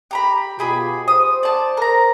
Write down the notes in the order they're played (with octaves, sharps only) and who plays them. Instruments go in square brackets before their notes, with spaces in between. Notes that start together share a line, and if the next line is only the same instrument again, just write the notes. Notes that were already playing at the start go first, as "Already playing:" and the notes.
[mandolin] G4 A#5 B5
[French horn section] B2 F4 [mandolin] G4 G#4 B5
[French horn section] C5 [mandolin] D#6
[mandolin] D5 A5
A#4 A#5